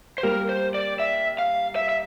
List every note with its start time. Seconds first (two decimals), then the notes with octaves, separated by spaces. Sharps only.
0.18 C5
0.23 G3 A#3 A#4
0.49 C5
0.74 D5
1.00 E5
1.39 F5
1.76 E5
1.89 E5